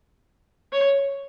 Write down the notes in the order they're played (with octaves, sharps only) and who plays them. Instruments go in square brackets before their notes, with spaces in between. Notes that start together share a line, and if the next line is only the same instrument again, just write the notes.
[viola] C#5